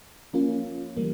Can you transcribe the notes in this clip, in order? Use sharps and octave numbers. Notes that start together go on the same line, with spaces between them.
F3 A#3 C#4 F4
E3 G3 A#3